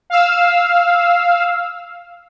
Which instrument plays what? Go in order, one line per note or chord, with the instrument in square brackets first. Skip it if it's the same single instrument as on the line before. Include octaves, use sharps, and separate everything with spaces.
[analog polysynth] F5 E6